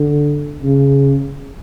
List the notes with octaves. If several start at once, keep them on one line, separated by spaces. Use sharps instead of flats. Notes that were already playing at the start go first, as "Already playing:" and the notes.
Already playing: D3
C#3